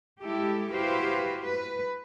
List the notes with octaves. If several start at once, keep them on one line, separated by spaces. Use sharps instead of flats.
G#3 E4 G4 A4
E4 F#4 G4 B4 C5 F5
B4